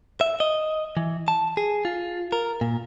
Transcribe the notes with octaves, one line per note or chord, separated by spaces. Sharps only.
E5
D#5
E3
A5
G#4
F4
A#4
A#2